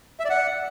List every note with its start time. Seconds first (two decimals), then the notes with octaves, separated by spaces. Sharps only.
0.20 E5
0.25 D5
0.30 F#5